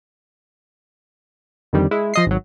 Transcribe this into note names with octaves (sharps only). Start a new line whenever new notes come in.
F2 D3 D#3 G3
G#3 E4
F3 D#5 C7
G#1 F#3